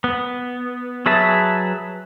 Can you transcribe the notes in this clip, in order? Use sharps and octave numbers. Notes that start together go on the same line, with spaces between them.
B3
F#3 G#4 B4 E5 A5